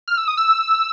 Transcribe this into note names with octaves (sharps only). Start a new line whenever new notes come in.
F6
E6
D#6
E6